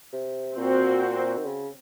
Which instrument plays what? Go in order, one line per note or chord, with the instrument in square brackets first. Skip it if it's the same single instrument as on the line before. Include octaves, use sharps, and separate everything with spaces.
[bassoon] C3
[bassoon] A#2 [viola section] C4 F#4 C5
[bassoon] D#3
C#3